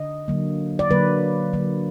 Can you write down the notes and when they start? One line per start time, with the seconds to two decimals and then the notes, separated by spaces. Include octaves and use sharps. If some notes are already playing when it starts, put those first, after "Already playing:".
Already playing: D3 D#5
0.28 D3 F#3 A#3
0.79 D5
0.90 D3 F#3 A#3 B4
1.53 D3 F#3 A#3